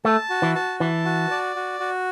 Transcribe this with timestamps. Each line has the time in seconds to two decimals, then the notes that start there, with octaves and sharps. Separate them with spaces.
0.05 A3 A5
0.30 F#4
0.42 E3
0.55 A5
0.80 E3 A5
1.05 F#4
1.31 D5
1.56 F#4
1.80 F#4